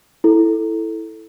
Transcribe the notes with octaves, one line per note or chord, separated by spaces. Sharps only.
E4 A4